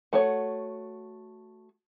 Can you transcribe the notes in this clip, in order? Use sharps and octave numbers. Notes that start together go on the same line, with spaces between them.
A3 F#4 C#5